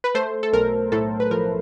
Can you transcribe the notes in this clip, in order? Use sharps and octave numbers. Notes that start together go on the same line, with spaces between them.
B4
A3 C5
A4
B1 A#4
A2 A4
B4
F3 A#4